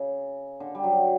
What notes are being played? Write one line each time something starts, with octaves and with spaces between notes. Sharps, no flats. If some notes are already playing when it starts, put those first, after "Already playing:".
Already playing: C#3
D3
G3
F#3